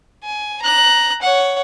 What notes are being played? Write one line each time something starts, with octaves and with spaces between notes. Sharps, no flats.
G#5
A#5 F#6
C#5 F#5